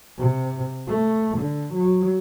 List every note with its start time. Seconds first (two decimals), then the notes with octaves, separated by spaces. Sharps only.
0.19 C3
0.89 A3
1.38 D3
1.74 F#3